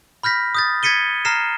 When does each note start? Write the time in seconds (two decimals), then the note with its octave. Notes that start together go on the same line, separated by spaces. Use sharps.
0.23 B5 F6 G6 A#6 B6
0.55 D#6 G6 A6
0.83 G#6 A6 B6 C#7 D#7 G7
1.25 A#5 F6 A#6 C7 E7